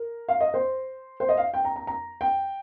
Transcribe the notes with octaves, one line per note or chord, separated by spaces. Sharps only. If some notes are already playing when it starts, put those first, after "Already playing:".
Already playing: A#4
F5
D#5
C5
C5
D#5
F5
G5
A#5
A#5
A#5
G5